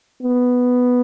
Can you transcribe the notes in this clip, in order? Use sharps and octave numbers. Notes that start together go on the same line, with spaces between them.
B3